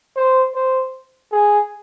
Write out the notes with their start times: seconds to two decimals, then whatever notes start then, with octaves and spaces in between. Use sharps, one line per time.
0.16 C5
0.54 C5
1.32 G#4